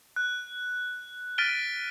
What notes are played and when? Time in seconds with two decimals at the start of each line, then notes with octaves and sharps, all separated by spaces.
0.16 F#6
1.38 F6 A6 B6 D7 D#7 G7